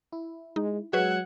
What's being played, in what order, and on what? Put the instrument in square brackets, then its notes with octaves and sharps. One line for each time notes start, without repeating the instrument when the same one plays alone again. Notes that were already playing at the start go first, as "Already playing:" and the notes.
[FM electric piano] E4
[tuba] G#3 [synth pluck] D#4
[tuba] F#3 [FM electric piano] G#3 E6 G#6 [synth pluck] F#4 B4 [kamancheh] F#5